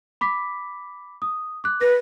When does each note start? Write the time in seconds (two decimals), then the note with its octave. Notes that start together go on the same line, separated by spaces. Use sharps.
0.21 B5 D6 B6
1.22 D#6
1.64 D6 F#6
1.81 B4 A#6